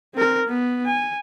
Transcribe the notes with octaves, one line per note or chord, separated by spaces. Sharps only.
C4 A#4
B3
G#5